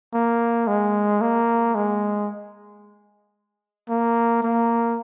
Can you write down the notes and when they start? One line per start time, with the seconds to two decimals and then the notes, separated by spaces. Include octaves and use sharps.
0.14 A#3
0.67 G#3
1.21 A#3
1.75 G#3
3.89 A#3
4.42 A#3